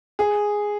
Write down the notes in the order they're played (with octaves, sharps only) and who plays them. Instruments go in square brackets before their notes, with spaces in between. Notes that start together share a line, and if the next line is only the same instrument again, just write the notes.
[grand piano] G#4